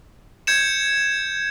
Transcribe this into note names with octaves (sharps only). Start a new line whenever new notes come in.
G6 G#6 C#7 E7